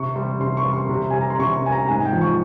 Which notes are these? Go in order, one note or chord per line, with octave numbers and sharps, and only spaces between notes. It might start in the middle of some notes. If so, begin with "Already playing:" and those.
Already playing: C3 C#6
G3 C6
C3 C6
C#6
G3
C6
C3
G3 G#5
A#5
C6
C3 C#6
G3 G#5
A#5
G#2 G#5
G5
F3
C#6